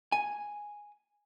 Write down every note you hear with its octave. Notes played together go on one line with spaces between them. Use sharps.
G#5